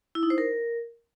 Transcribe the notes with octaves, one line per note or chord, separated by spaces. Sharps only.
E4
D#4
C5
A#4